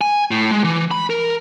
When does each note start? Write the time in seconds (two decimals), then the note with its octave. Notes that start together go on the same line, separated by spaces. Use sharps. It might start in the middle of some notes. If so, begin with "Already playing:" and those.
0.01 G#5
0.31 A2
0.51 G#3
0.64 E3
0.91 B5
1.10 A#4